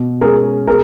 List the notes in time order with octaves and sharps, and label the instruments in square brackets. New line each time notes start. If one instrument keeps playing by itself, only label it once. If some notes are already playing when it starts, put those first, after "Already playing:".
Already playing: [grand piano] B2
[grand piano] G#3 C#4 [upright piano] G#4 A#4
[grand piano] B2 [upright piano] G#4 A#4